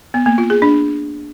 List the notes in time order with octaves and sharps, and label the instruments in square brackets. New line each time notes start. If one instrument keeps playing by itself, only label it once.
[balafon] B3
A#3
F4
G#4
D4